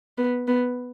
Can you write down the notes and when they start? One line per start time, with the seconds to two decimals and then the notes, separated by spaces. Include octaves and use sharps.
0.18 B3
0.48 B3